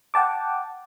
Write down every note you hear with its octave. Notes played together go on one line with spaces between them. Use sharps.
F#5 G5 A5 D6